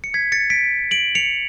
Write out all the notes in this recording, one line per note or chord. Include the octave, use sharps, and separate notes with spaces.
C#7
G#6 B6
A6 C#7
B6 D7
D7 F#7
C#7 F7